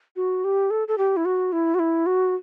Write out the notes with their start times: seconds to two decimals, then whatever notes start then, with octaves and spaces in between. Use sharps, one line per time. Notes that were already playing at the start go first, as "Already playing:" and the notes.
0.16 F#4
0.44 G4
0.70 A4
0.88 A4
0.98 G4
1.17 E4
1.25 F#4
1.52 E4
1.75 F#4
1.79 E4
2.06 F#4